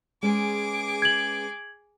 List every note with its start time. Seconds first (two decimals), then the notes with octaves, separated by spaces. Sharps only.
0.23 G#3 C#4 G#4 B4 D6
1.02 G#6 F#7